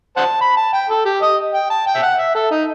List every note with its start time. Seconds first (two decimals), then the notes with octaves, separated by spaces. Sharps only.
0.17 C5 F#5 A5
0.41 B5
0.57 A5
0.73 G5
0.89 A4
1.05 G4
1.22 D#5
1.54 G5
1.70 A5
1.87 G5
1.95 E5
2.02 F#5
2.18 E5
2.35 A4
2.51 D#4